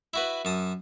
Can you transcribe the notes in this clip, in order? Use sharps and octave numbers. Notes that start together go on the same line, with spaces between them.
E4 F#4 B4
F#2 A5 D#6